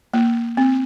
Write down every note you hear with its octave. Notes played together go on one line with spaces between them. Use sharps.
A#3
C4